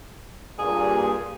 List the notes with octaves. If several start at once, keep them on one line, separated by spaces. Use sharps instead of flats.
G2 A#2 G#4